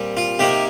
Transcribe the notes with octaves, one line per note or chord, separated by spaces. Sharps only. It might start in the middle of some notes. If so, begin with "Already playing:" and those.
Already playing: A#2 G3 C4
F4
C3 D#3 A#3 G4